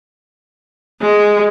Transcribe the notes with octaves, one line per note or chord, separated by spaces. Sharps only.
G#3